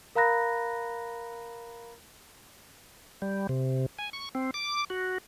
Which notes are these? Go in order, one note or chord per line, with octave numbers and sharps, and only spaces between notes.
A#4 F5 A#5 B5 F#6 A#6
G3
C3
G#5
C#6
C4
D6
F#4